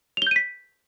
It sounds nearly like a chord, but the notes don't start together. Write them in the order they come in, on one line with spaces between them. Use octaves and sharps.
F7 G7 G6 D#7 B6